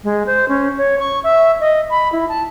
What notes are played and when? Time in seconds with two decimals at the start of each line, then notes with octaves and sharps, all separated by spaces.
0.04 G#3
0.26 C5
0.49 C#4
0.78 C#5
0.99 C#6
1.24 E5
1.60 D#5
1.91 B5
2.12 E4
2.29 A5